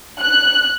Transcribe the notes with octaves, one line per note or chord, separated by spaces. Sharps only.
F#6